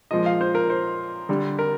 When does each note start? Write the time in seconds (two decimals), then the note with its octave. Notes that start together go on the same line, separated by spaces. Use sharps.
0.11 A#2 F3 G#3 D#5
0.26 F5
0.41 C5
0.55 A#4
0.70 C5
1.29 D3 G3
1.59 A#4